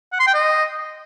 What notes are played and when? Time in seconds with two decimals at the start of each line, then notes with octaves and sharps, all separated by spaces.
0.13 F#5
0.20 C6
0.27 G5
0.34 D#5